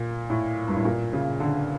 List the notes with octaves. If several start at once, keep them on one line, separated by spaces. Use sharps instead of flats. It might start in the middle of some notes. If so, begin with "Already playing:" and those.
Already playing: A#2
A2
G2
A2
A#2
C#3
D3